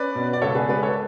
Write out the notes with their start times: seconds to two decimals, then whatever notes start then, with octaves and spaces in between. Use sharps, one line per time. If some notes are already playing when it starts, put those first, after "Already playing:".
Already playing: C#4 B4 D5
0.15 B2
0.33 D5
0.42 C#2 A4 C#5
0.55 G#4 B4
0.69 G#3 B4 D5
0.83 A4 C#5